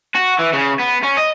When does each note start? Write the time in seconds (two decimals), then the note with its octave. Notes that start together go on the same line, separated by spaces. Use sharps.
0.15 F#4
0.39 E3
0.53 C#3
0.79 B3
1.03 C#4
1.17 D#5